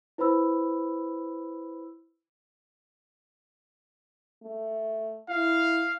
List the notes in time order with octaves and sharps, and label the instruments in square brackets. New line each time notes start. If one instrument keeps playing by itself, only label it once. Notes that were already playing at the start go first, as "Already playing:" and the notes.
[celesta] E4 B4 C5 B5 E6
[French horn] A3
[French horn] E4 [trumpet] F5